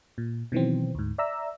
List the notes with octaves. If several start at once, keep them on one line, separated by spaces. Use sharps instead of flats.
A#2
B2 D#3 E3 F#3 C4
D2 G#2
D5 E5 A#5 E6